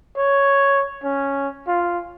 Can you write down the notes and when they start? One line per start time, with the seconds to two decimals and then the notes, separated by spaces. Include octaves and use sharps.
0.17 C#5
1.04 C#4
1.67 F4